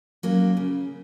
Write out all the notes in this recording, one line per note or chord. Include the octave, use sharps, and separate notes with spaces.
F#3 A#3 C#4
C#3